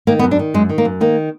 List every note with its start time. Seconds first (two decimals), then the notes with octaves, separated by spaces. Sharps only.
0.07 D#3 A#3
0.19 B3
0.24 F#2
0.31 D4
0.39 D#3
0.54 F#2 G#3
0.69 D#3
0.78 A#3
0.85 F#2
1.01 D#3 A#3